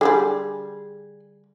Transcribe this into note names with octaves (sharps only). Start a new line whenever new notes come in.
D3 F3 G3 G#4